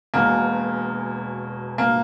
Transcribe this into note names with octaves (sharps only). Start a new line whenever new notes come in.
E1 E2 B2 A#3
A#3